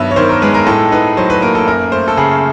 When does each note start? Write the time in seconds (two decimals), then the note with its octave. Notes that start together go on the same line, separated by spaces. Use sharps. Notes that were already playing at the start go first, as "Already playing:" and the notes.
Already playing: G2 D#3 F#3 B3 E5
0.11 C#5
0.16 D#3 C5
0.30 A#4
0.42 G#3 B4
0.54 A#4
0.67 A2 A4
0.92 D#4 B4
1.17 F#3 C5
1.30 B4
1.42 A#3 A#4
1.55 A4
1.67 F#2 A#4
1.92 A3 C5
2.08 A4
2.17 C#3 G#4